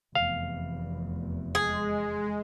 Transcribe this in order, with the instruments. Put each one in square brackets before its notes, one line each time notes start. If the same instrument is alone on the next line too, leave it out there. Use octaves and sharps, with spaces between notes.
[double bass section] F1 E2 [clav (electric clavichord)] F5
[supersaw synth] G#3 [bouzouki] G#4